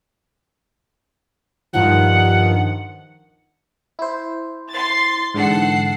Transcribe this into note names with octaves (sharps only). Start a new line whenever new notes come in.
G2 D#3 F3 F#5
E4 C5
C6 A6
G#2 D3 E3 A4 F#5 C7